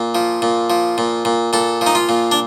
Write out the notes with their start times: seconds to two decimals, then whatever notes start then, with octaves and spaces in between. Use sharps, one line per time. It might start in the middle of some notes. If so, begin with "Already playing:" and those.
Already playing: A#2
0.15 F3
0.42 A#2
0.70 F3
0.98 A#2
1.25 A#2
1.53 A#2 A4
1.81 F3
1.87 D#4
1.95 F4
2.09 A#2
2.32 D4